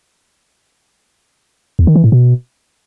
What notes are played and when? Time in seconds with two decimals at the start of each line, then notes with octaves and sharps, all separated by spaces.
1.79 E2
1.87 D#3
1.96 E3
2.04 A2
2.12 B2